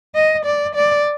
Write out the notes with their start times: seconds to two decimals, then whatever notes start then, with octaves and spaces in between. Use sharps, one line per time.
0.15 D#5
0.45 D5
0.75 D5